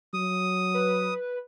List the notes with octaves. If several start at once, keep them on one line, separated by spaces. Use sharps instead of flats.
F#3 D#6
B4